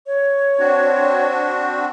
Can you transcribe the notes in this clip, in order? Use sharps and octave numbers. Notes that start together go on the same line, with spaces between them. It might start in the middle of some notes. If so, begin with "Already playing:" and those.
C#5
C4 D4 F#4